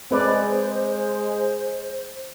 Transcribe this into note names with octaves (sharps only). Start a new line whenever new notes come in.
G#3 C4 B4 C5 D5